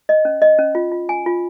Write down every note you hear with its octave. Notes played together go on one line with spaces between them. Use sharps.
D#5
C#4
D#5
C#4
F4
F4
G#5
F4